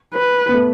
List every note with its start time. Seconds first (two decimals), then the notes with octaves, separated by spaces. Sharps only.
0.15 B4
0.49 B3
0.54 A3